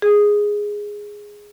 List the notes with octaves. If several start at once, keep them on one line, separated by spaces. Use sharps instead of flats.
G#4